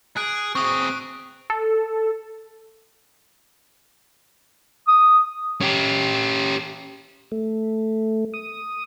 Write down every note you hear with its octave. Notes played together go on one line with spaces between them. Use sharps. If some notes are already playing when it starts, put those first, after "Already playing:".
G#4 F#6 D7
C4 G#4 C#6 D#6
A4
D#6
C#4 G4
A3
D#6